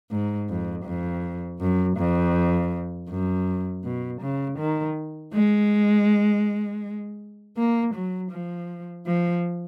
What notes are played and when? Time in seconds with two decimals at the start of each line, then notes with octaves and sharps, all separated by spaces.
0.11 G#2
0.49 F2
0.85 F2
1.61 F#2
1.97 F2
3.09 F#2
3.84 B2
4.21 C#3
4.59 D#3
5.34 G#3
7.57 A#3
7.95 F#3
8.32 F3
9.07 F3